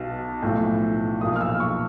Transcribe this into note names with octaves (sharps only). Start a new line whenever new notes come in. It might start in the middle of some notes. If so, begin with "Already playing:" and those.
Already playing: B1 B2
B1 A2 F3
B1 A#2 F3 D#6
F6
E6
C#6